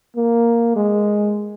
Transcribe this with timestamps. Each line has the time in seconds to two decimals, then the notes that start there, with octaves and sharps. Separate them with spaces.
0.16 A#3
0.76 G#3